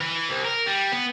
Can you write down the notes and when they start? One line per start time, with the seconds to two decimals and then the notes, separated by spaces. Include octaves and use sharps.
0.01 E3
0.29 C2
0.45 A#4
0.66 G3
0.92 B3